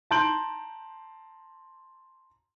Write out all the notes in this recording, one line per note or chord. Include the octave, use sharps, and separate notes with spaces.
A5 A#5 C6 G6 D7 F#7